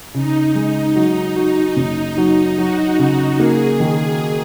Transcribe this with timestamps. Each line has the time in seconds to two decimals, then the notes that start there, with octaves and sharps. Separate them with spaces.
0.14 C#3 D#4
0.55 G#3
0.96 F#3
1.36 F#4
1.77 F#1
2.18 F#3
2.58 F#3 F#4
2.99 C#3
3.39 A#3 G#4
3.80 D#3